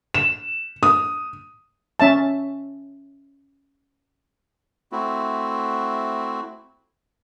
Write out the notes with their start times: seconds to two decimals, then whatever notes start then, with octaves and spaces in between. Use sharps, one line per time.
0.14 E7
0.83 D#6
2.00 C#4 E5 A5
4.92 A3 C4 E4 F#4